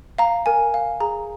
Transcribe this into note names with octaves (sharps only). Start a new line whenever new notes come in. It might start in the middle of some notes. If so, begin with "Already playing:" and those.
F5 A#5
A#4 G#5
F5
G#4 A#5